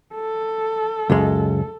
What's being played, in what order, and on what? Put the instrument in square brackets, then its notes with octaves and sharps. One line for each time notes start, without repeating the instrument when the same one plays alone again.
[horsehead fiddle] A4
[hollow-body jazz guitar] C#2 F#2 G#3